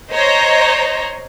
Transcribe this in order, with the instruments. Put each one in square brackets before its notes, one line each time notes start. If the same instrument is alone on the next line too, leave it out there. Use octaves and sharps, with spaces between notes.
[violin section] C5 C#5 D#5 A#5